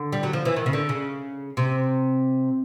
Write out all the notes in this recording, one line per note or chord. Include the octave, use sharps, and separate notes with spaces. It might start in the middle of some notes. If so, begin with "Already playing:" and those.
Already playing: D3
G3
F#3
F3
E3
D#3
C#3
D3
C#3
C3